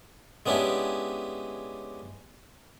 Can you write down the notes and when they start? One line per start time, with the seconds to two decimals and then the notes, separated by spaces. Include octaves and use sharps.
0.46 G#3 B3 C#4 D4 E4 G4